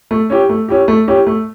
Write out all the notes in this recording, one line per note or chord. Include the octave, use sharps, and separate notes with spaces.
A3
C#4 E4 G4
A3
C#4 E4 G4
A3
C#4 E4 G4
A3